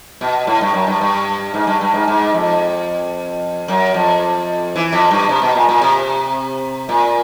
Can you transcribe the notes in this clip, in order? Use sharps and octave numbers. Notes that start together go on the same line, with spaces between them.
B2
A2
G2
F#2
G2
G2
G#2
G2
G2
G#2
G#2
F2
F#2
F2
E3
F2
G2
C3
B2
A#2
A#2
C3
A#2